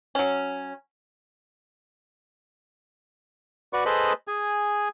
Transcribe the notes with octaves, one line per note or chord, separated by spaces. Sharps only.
F#3 C#4
F#4 B4 D5 C#6
G#4 A4 B4 C5 D#5 B5
G#4 G#5